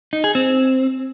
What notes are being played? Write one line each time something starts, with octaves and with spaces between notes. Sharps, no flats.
D#4
G#4
C4